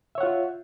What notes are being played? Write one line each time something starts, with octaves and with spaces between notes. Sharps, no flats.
F4 C#5 E5 F#5